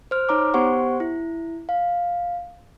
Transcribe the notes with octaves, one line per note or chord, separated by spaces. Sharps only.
C5 F6
D#4 C#5 A#5 D6
B3 G4 C5 F#5 C#6
E4
F5